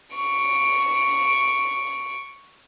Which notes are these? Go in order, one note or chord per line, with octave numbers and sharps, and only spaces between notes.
C#6 D7